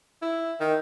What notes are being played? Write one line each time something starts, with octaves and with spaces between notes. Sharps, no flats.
E4
D#3